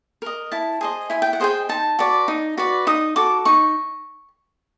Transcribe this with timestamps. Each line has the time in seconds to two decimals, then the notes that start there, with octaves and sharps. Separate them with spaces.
0.22 A#4 D#5
0.52 E4 A5
0.81 G#4 C5 D#5
1.10 E4 G#5
1.22 G5
1.33 F#5
1.40 G#4 C5 D#5 G5
1.69 D#4 A5
1.99 F#4 B4 D5
2.28 D#4
2.57 F#4 B4 D5
2.87 D#4 D#6
3.16 F#4 A4 D6
3.45 D#4 C#6